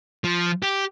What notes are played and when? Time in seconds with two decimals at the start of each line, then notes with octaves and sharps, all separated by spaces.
0.24 F3
0.63 G4